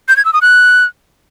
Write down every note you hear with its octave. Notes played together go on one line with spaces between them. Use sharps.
G6
G#6
E6
D#6
F#6